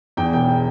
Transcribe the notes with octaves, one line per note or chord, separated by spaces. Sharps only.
E2 G5
E1 G5
G5